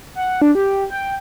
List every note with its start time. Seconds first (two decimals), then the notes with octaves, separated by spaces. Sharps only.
0.15 F#5
0.42 D4
0.55 G4
0.90 G5